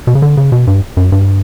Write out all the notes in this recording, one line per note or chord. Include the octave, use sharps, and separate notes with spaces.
B2
C#3
D3
C#3
B2
G2
F#2
G2